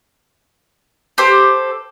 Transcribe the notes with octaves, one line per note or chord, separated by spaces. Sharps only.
G4 A4 C5